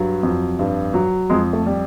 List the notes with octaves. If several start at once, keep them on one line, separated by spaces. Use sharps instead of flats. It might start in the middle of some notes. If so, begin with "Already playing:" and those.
Already playing: G2 F#3
F2
G2
F#3
F2 G#3
A3
G3